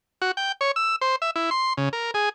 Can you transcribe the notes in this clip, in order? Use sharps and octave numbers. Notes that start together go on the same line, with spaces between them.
F#4
G5
C#5
E6
C5
E5
E4
C6
C#3
A#4
G#4